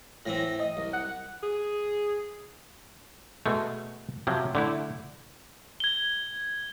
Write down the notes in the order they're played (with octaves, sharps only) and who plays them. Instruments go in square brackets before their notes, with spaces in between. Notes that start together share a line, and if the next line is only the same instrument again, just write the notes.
[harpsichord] A2 E3 C4 [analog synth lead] A#6
[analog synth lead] D#5
[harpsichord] C2
[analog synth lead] F#5
[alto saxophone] G#4
[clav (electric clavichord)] B2 G#3 A3
C3 F3 F#3
D3 A3 E4
[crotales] G#6 G7